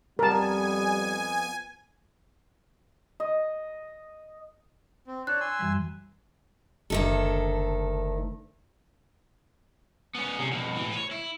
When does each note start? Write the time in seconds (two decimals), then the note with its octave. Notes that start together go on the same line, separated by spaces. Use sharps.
0.19 F2 G3 B3 A#4 G#5 A5
3.20 D#5
5.07 C4
5.27 D4 C#5 A5 F#6
5.40 G#5 C6 E6
5.59 F#2 E3 G3
6.90 F#1 D2 D#3 A4
10.15 B3 C#4
10.38 C3 C#4
10.52 F2 B2
10.76 A2 E3
10.93 B4 C#5
11.11 E4